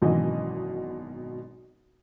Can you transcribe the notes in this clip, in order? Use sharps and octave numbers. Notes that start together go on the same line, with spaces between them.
G#1 F#2 B2 E3 F#4 D#5